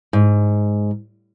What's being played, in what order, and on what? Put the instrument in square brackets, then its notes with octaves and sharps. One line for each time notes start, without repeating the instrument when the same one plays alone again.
[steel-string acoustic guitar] G#2